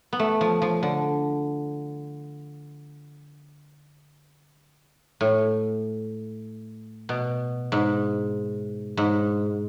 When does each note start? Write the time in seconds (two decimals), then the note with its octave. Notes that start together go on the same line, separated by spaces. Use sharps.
0.13 B3
0.19 A3
0.41 F3
0.62 F3
0.83 D3
5.21 A2
7.09 B2
7.72 G#2
8.97 G#2